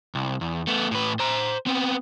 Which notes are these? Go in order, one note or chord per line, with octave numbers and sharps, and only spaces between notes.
C2
E2
A3 B3
A2 B4
C5 A#5
B3 C4